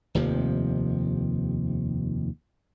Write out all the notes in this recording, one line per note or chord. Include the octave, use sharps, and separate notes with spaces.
F1 D#2 C3 F3